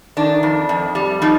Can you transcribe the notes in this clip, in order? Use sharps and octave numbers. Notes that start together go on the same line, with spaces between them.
D#3 D4
F2
F2
G3
F3 D#4